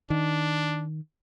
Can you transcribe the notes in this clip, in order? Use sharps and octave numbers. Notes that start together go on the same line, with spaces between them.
D#3 D4